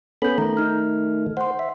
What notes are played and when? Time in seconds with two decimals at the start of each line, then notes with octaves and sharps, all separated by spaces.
0.22 B3 C#4 A4 B5 G6
0.38 D#3 A3 A#5
0.57 D#4 F6
1.37 C5 F#5 C6
1.59 E5